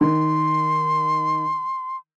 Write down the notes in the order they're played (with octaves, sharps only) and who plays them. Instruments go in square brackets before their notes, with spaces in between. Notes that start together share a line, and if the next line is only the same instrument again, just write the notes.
[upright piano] D#3 [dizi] C6